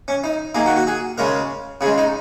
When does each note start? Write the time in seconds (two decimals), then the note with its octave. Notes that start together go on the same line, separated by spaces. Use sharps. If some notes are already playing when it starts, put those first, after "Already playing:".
0.08 C#4
0.24 D#4
0.55 D#3 A#3 G#4
0.66 F#4
0.76 F#4
0.87 G#4
1.18 C#3 G#3 A#4
1.81 C#3 G#4
1.86 G#3
1.98 D#4